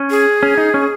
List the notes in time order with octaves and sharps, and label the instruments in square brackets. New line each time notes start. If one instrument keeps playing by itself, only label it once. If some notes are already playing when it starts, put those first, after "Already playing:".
Already playing: [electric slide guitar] C#4
[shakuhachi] G#4
[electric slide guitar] C#4
D#4
C#4